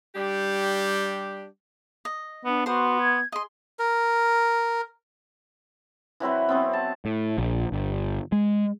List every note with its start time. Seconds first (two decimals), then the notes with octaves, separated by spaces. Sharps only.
0.15 G3 D4 G4
2.05 D#5
2.45 B3 D4
2.66 B3 F#4 C5 C6
2.99 G#6
3.32 G#4 D#5 C6
3.79 A#4
6.20 E3 F#3 C4 B4
6.49 F#3 B3 C4
6.73 A5
7.05 A2
7.38 A#1
7.72 G1
8.32 G#3